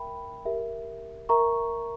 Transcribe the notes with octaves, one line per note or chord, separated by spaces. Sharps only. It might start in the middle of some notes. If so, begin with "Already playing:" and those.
Already playing: A#4 E5 G5 B5
G4 A#4 E5
A#4 E5 A#5 C#6